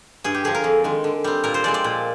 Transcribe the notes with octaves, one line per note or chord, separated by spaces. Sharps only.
G2 G#4
G4
D3 F3 G#4
A#4
F2
D#3 G#3
D3
G3 C4
A#2 A#4
C5
F3 G#3 C4 D5
D5
A#2